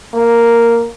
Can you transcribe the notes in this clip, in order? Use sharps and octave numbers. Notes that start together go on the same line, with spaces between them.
A#3